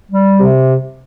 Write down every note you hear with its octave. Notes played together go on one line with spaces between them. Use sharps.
G3
C3